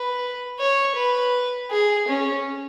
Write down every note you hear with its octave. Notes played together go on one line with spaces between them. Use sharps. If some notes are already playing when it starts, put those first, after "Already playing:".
Already playing: B4
C#5
B4
G#4
C#4